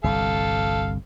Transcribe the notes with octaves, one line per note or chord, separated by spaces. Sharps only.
G1 C2 G2 A4 F5